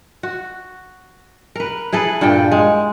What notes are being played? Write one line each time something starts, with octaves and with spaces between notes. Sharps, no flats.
F#4
A#4 B4
E4 G#4 A4 B4
G2 A#2 A4 G5
G#3